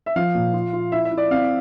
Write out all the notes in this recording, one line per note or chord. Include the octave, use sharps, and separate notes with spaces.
E5
F3 F5
A#2
F4
F4
E4 E5
E5
E4
D5
C4 F5